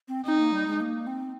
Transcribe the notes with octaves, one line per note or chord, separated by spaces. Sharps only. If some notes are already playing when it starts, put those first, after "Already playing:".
C4
C4 D#4
A#3
G3
G#3
A#3
C4